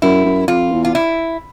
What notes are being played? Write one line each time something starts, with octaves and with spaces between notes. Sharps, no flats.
F#2 E4
F#2
F2 F4
E2
F4
E4